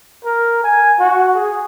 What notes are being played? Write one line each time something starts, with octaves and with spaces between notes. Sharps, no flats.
A#4
G#5
F#4
G#4